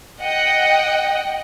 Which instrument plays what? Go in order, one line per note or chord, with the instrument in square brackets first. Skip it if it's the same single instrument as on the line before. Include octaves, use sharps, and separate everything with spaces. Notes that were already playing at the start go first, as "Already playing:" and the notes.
[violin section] D#5 F#5 G5